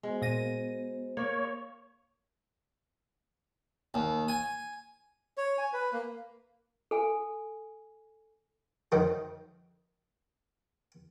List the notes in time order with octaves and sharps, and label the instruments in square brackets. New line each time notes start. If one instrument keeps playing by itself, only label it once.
[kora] G#3 [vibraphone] B3 F#4 C5
[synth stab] A#2 A#6 D#7
[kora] A#3 [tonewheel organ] C#5
[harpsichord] D#2
G#5
[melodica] C#5
G#5
B4
A#3
[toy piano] A4 G#5
[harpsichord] F2 D#3 F#3